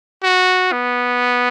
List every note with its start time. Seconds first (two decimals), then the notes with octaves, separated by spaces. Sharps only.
0.23 F#4
0.72 B3